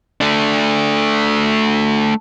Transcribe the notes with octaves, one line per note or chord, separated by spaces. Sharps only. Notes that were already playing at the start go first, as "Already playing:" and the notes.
A3 D4